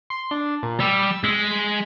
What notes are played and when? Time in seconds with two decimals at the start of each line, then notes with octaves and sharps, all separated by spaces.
0.10 C6
0.31 D4
0.63 A#2
0.80 G3 E6
1.24 G#3 B6